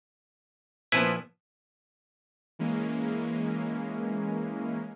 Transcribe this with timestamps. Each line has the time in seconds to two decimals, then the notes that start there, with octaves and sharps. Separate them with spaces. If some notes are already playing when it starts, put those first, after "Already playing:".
0.92 A#2 F3 B3 E4 B4 G#5
2.59 E3 G#3 A#3 C#4